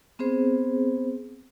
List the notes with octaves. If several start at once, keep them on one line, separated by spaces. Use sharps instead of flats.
B3 C4 G#4 C5